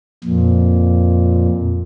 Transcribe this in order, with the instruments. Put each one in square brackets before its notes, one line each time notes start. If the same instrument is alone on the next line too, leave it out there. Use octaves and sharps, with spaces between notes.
[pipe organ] F2 A#2